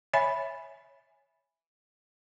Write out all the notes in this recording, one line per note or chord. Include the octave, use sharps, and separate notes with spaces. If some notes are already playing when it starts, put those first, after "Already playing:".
C#5 E5 G#5 B5